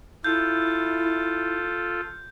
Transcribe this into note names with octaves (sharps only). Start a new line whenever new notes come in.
E4 F4 A4 G6